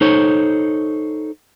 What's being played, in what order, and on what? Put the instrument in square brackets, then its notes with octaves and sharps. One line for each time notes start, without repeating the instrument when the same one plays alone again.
[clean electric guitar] D#4 A4 C5 C#5